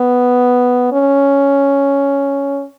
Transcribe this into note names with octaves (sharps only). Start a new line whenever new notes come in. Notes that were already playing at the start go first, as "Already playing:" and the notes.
Already playing: B3
C#4